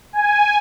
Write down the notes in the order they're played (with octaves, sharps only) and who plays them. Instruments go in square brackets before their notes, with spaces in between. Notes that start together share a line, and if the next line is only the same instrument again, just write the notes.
[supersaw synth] G#5